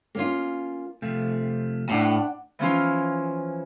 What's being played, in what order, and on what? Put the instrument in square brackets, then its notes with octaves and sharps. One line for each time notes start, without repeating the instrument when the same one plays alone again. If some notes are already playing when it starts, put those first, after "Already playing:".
[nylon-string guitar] A#3 C#4 F4
[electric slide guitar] C3 F3 A3
[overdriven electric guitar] A2 [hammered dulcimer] D4 F#5 G5
[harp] E3 F3 C#4 F4